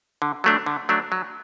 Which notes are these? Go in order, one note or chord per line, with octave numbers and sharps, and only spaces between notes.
D3
F#3 A3 D4
D3
F#3 A3 D4
F#3